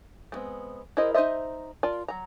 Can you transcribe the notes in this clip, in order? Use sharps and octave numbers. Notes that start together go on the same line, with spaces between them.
G3 G#3 B3 C4
E4 G#4 A#4 C5 D#5
D#4 G#4 C5 D#5 E5
F4 A#4 D5 A5
F#3 A#5